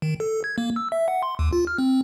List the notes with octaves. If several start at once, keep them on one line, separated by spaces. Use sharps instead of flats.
D#3
A4
G#6
A#3
E6
E5
F#5
C6
D#2
F4
F6
C4